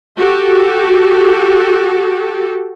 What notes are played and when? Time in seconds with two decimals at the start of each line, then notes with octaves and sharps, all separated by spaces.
0.18 F#4 G4 A4